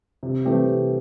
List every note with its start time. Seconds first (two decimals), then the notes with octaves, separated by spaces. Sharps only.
0.23 C3
0.45 E3 A3 C4 G4
0.66 C3